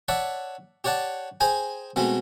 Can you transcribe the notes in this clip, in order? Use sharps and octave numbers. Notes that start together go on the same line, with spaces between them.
C#5 D5 E5 F#5 A5
G4 C#5 D5 F#5 A5
G#4 C5 G5 G#5 A#5
B2 G#3 A3 C4